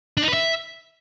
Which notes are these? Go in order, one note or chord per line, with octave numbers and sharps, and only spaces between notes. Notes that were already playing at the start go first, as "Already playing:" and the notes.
D4
D#4
B4
E5